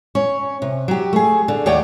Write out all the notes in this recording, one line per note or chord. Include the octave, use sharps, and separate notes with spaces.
C#4 C#5
C3
F#3 G4
A3 G#4
D3
D#2 A3 C#5 D5 F#5 G5